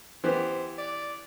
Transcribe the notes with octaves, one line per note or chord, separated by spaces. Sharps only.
E3 B3 G4 C5
D5